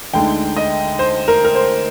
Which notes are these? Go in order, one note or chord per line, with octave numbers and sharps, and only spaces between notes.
D2 D3 G#3 D#4 G5
D#5
C5
A#4
A#4
C5